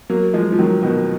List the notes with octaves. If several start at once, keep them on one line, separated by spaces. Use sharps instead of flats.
F#3 A#3
F3 G#3
F3
D#3 F#3
B2 D#3